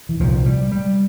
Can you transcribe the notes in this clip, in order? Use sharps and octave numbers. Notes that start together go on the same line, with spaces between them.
E3
C2 A#2 F3
G3
G3